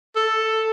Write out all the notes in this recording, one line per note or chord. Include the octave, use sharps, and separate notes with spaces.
A4